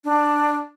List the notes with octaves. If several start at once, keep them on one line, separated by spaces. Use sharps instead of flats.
D4